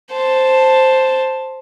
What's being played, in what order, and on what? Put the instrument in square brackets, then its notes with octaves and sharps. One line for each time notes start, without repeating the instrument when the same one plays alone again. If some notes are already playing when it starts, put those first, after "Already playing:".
[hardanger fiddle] C5 A5